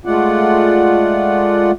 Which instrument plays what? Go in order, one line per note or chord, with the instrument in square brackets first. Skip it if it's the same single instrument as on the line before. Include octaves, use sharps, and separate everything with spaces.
[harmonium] G#3 A3 F4 D5 F#5